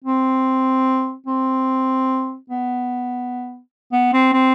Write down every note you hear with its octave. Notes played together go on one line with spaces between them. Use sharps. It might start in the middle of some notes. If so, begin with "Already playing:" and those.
C4
C4
B3
B3
C4
C4